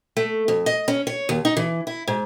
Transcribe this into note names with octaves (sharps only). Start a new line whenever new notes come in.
A3
F2
D#5
C#4
C#5
D#2
D#4
E3
E4
G#2